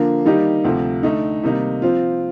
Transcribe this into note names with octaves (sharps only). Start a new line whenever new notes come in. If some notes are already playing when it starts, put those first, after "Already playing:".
Already playing: D3 F3 A#3 D4
D#3 G3 A#3 D#4 G4
D2 C3 F3
D3 A3 D#4
C3 D#3 G3 A#3 D#4
F3 C4 F4